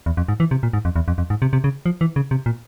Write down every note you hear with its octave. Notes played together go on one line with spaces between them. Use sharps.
E2
F2
G#2
E3
C3
A#2
G#2
F2
E2
F2
F2
G#2
C3
C3
C#3
F3
E3
C#3
C3
A#2